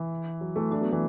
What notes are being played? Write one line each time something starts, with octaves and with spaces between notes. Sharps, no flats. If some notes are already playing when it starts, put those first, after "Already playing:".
Already playing: E3
F#3
E3 A3
A3 D4
F#3 B3
E3 A3